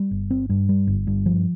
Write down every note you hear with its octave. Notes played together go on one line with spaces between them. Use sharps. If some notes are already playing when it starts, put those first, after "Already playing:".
Already playing: G3
G1
C4
G2
G3
G1
G2
F3